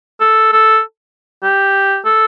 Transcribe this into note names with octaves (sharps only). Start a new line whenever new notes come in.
A4
A4
G4
A4